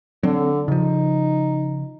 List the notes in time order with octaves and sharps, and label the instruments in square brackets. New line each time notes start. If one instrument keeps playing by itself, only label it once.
[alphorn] D3 [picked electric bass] F#3 C4
[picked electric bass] C#3 F3 [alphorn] D#4